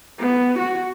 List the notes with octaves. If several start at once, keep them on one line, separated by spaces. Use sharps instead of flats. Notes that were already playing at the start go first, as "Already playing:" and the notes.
B3
F#4